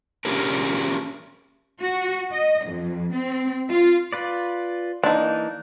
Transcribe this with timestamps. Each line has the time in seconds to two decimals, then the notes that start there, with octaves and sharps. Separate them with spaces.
0.25 A#3 C#4 D4 G4 G#4 A#4
1.81 F#4
2.31 D#5
2.66 F2
3.13 C4
3.69 F4
4.13 F4 B4 D5
5.04 E3 A#3 D4 D#4